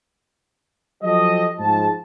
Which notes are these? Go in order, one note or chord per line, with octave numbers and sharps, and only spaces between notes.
F3 F#3 G4 A4 D#5
G#2 F3 A5